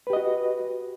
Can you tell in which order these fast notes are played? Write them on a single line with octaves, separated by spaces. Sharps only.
B4 G4 D#5 F#4